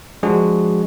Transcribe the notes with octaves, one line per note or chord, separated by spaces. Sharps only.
F3 G#3 D4 F#4 G#4